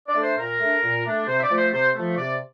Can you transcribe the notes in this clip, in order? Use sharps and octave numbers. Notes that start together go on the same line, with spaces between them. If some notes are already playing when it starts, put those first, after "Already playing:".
D5
A3 D4
C5
A#2 A#4
A3 D4
A#2
A3 D4
C3 C5
E5
D5
F3 A3
C5
C3 C5
F3 A3
C3 D5